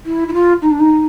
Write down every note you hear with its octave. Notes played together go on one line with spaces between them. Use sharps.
E4
E4
F4
D#4
D4
D#4